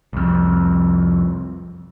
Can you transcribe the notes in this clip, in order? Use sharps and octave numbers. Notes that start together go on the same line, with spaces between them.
C2 F2